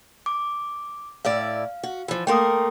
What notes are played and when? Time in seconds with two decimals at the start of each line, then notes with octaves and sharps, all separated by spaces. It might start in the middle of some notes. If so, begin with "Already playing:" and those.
0.26 D6
1.25 A2 E4 D5 F5
1.83 F#4
2.08 E3 F3
2.27 A3 A#3 A#4 G5 C6 D#6